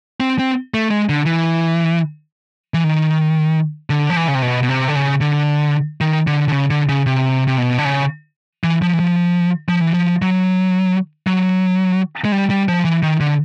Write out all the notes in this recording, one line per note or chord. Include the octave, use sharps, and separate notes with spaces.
C4
C4
A3
G#3
D3
E3
E3
D#3
D3
F3
E3
C#3
C3
B2
B2
C3
D3
C#3
D3
D#3
D3
D3
C#3
D3
C#3
C3
C3
B2
D3
C#3
E3
F3
E3
F3
F3
E3
F3
F#3
F#3
G#3
G3
G3
F3
E3
D#3
D3